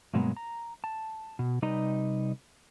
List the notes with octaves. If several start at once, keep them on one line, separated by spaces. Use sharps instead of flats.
G2 B2 F#3 G#3 A#3 B3
A#5
A5
B2
C3 G3 D#4 B4 D#5 A#5